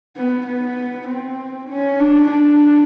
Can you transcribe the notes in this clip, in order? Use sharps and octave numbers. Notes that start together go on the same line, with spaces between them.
B3
B3
C4
C#4
D4
D4